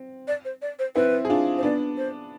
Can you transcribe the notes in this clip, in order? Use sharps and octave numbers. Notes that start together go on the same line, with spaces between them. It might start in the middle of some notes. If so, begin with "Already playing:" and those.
Already playing: C4
D5
C5
D5
C5
C4 E4 B4
G#4
D4 F4
C5
B3 D4 D5
C5